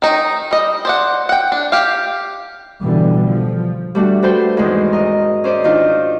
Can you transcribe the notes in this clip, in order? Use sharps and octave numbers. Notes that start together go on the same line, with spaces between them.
D#3 D#4
G3 D#5
C5 D5 F#5
F#5 G5
D4
G4 F5
B2 D3 E3 G3
F3
G3 A3 D4 F#4
F#4 A4 B4 C5 G5 C6
E2 G#2 D#3 G#3 C4
A#4 D#5
C#4 C5 D5 D#5
D#3 D4 D#4 F4